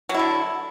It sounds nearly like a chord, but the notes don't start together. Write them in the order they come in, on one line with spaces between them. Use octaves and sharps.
F#3 E4 D3